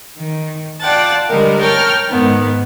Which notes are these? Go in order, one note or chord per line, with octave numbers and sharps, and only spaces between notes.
D#3
F4 D5 F#5 G5 A5
D3 G3 G#3 A#4
A#4 C#5 G5 A5 F6
G#2 D#3 B3